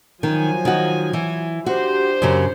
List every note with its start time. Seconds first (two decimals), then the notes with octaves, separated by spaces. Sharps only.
0.23 D#3 F3 F#3 G#5
0.65 D#3 F#4
1.13 E3
1.66 D4 F#4 G4 C5
2.22 F#2 C#3 F#3